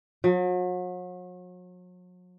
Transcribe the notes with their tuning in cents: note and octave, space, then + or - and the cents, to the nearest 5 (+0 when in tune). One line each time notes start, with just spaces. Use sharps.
F#3 -40